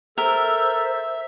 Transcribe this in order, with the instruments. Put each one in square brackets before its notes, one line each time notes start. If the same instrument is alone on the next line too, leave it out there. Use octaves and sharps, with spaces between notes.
[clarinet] A4 [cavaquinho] A#4 [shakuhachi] C5 [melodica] E5